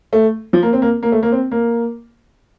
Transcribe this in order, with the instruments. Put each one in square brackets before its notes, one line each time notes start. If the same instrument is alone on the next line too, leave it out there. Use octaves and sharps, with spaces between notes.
[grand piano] A3
F3
A#3
C4
A#3
A#3
A3
A#3
C4
A#3